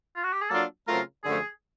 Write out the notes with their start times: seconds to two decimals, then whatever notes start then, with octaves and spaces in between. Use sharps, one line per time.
0.16 F4
0.23 F#4
0.33 G4
0.41 G#4
0.50 F#3 A#3 D4 F4 A4
0.87 C#3 F#3 A3 C4 F4 A#4
1.24 F#2 D3 F3 A3 G#4